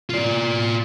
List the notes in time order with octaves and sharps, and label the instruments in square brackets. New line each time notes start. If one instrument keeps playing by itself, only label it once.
[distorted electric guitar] F4 D5